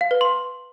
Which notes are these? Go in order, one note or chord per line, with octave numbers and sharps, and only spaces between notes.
F5
B4
C6